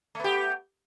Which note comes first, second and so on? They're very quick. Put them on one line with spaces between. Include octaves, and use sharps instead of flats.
A3 B3 G4